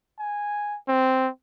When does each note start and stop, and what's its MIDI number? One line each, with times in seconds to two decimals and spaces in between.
0.19 0.77 80
0.88 1.29 60